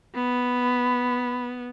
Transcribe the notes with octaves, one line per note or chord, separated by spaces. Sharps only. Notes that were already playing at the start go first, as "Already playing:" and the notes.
B3 B5